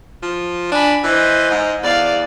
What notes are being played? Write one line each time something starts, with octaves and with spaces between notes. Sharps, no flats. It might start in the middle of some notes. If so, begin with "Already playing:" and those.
F3
D4 G#5 B5
E3 C5 D#5
G#2
E2 D5 F5